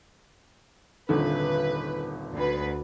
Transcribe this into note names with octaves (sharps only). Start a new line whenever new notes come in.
D#1 G#1 D3 B4
D2 B4